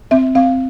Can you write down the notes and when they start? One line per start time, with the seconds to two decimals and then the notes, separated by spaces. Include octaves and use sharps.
0.11 C4 E5
0.35 C4 F5